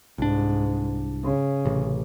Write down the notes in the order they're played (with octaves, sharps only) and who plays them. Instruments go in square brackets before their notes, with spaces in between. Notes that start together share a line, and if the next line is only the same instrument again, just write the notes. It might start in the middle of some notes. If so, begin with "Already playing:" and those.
[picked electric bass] C2 D4 [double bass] G#2
[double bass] C#3
[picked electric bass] A1 C3